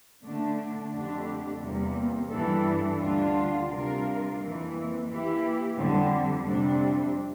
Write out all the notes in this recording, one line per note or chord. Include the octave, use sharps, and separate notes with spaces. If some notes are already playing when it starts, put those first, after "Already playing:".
D3 A3 D4
F2 D3 A3 D4 G4
E2 C3 G3 A#3
G2 E3 G3 D4 A4
D2 D3 G3 D4 F4
C3 G3 D4 F4 A#4
F2 E3 A#3
E3 A#3 E4 G4
F2 D3 G3 D4
F2 C3 G3 D4